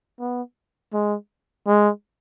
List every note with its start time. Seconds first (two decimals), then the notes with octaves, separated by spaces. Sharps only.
0.19 B3
0.93 G#3
1.67 G#3